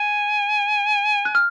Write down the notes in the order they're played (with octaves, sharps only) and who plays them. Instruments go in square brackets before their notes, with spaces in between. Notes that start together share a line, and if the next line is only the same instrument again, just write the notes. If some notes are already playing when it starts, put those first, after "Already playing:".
Already playing: [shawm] G#5
[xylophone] F#6
F6